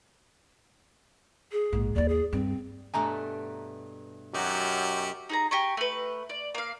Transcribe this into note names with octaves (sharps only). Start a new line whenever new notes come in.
G#4
A#1 G#2
D#2 E4 D5
G#4
G2 C4
G2 B2 A3 G#5 A#5
F#2 F#3 D#4 F#4 G4
D#4 G#4 A#5
G4 G#5 A#5 C#6
A3 B4
D5
A#3 F5